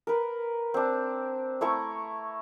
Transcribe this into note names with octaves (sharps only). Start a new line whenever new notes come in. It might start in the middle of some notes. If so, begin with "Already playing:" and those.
A#4 B4
C4 D4
A3 E4 A#5 C#6